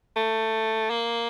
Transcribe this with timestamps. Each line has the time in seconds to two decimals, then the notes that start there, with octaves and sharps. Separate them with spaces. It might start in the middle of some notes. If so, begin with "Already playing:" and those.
0.17 A3
0.90 A#3